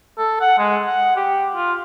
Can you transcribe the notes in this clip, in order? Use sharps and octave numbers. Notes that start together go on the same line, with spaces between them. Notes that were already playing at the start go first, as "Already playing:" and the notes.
A4
F#5
G#3
F#5
G4
F4